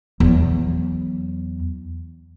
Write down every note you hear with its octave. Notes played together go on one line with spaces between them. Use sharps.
E2 F#3